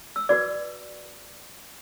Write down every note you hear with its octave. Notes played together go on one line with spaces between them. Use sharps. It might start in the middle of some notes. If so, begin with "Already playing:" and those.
E6
F#4 B4 D5 D6